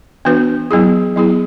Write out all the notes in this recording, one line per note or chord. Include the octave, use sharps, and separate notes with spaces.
E3 B3 D4 F#4 B4
F#3 B3 E4 G#4
F#3 B3 E4 G#4